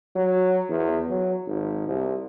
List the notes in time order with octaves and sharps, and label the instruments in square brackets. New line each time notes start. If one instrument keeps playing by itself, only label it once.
[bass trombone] F#3
E2
F#3
G#1
C2